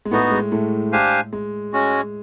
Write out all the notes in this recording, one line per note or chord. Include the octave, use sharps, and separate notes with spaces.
G#3
A2 A3 B3 D#4 F#4
G#3
A2 A3
D4 G4 C5 F5 G#5
G#3
G#3 C#4 F#4